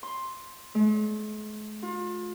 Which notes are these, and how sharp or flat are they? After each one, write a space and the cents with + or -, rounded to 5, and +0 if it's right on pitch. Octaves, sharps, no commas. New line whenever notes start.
C6 +10
G#3 +45
F4 +35